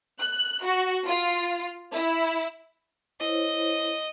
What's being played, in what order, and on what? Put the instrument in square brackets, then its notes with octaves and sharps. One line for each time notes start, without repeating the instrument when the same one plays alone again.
[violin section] F#6
F#4
F4
E4
[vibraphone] E4 C5 C#5 [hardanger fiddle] D#5